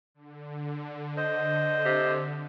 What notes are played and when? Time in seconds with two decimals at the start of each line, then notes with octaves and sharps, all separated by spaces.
0.15 D3
1.17 C5 D#5
1.85 C3